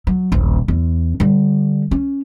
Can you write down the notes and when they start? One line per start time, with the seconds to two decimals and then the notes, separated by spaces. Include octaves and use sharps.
0.07 F#3
0.32 D#1 A#1
0.68 E2
1.20 D3 G3
1.91 C#4